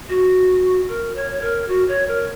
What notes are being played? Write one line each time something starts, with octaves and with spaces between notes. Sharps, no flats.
F#4
A#4
C#5
C#5
A#4
F#4
C#5
A#4